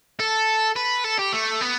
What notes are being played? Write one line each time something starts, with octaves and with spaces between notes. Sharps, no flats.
A4
B4
A4
G4
A3
B3